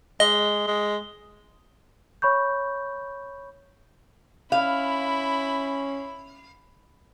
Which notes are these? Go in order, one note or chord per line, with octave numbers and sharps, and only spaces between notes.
G#3 D#5 G7
G#3
C#5 B5 C#6 G6
C#4 E4 F5 B5